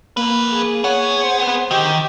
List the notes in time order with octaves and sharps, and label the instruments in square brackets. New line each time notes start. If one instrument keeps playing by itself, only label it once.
[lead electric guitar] F2 B4 [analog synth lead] A#3
[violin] G#4
[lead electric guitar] B3 F#5 [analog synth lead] C#5
[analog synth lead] C5
[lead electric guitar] D#3 [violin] G4